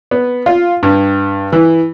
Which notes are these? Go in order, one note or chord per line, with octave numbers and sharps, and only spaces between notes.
B3
F4
G2
E3